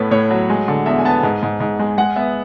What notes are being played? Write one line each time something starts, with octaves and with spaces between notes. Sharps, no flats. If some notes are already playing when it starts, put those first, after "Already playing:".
Already playing: A2 B3 A4 B4 C#5
A2 C#5
F#3
G#3
D3
E2 E5
G#5
B3 A5
G#2
G#2
G#2
G#3
G#3 F#5
B3 E5